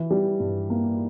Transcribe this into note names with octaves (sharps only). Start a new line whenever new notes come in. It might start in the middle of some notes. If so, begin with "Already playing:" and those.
Already playing: E3
G3
G2
A#3